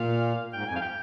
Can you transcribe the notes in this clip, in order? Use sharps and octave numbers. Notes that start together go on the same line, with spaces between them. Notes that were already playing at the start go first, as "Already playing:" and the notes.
Already playing: A#2 F5
G#2 G5
F2 G#5
F5
G5